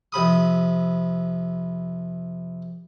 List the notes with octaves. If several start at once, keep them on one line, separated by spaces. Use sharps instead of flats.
F2 C3 B5 D#6